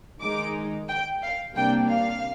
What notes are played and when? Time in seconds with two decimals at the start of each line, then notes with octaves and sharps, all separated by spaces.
0.20 D#3 G#3 D#4 D6
0.88 G5
1.22 F5
1.55 C3 G3 A#3 D4 G5
1.89 F5